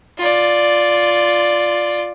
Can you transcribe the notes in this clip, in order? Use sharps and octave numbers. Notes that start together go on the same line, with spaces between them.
F4 D5